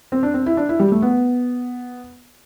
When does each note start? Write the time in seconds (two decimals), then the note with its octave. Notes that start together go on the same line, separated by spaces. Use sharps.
0.12 C4
0.23 D4
0.34 C4
0.46 E4
0.57 D4
0.69 E4
0.80 G3
0.92 A3
1.02 B3